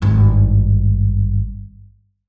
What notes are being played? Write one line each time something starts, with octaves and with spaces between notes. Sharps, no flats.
G#1 G2